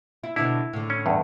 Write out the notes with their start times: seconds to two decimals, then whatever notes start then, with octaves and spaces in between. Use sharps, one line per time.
0.24 E4
0.36 B2 D3 D4 E4
0.73 A2 D3
0.90 C#4
1.06 E2 G2